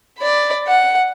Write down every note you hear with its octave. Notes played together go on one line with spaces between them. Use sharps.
D5 B5
F#5